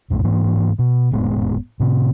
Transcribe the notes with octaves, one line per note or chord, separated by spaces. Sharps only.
E1 B1 F#2 A2
G#2 E3 A#3
B2
F1 A2 G#3 B3
A2 C3